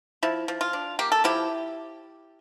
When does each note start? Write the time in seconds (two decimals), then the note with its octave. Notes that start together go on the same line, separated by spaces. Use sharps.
0.23 F3 E4
0.48 F3
0.61 F4
0.73 D4
0.99 A#3 G4
1.12 A4
1.24 F3 E4 G4